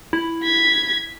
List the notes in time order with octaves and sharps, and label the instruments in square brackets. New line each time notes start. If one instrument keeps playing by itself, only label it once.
[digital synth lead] E4
[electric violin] G#6 B6